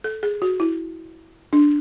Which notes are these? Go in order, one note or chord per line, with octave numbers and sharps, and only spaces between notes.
A4
G#4
F#4
E4
D4